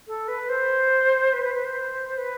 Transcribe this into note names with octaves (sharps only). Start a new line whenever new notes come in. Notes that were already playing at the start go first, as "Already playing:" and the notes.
A4
B4
C5
B4
B4
B4
C5
B4